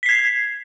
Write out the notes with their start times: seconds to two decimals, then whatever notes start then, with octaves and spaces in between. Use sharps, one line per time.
0.03 B6
0.06 C7
0.09 G#6